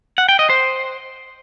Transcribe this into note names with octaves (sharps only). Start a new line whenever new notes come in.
F#5
G5
D#5
C5